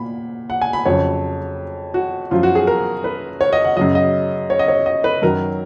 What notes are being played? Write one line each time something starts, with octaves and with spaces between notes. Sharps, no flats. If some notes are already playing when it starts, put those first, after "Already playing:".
Already playing: A#2 B5
F#5
G#5
B5
F2 C#3 F#3 C#5
F#4
F#2 F3 F4
F#4
G#4
A#4
B4
C#5
D#5
F#5
F#2 C#3 F#3 D#5
D#5
C#5
D#5
C#5
D#5
B4
F#2 D#3 F#3 A#4